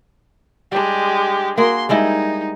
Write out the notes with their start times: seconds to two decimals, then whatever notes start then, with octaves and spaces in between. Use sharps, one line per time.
0.72 G3 G#3 D4 G4
1.58 A#3 F#4 G#4 C6
1.89 G3 G#3 D#4 E4